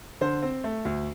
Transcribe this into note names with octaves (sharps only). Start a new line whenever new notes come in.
D3 C5
C4
A3
D2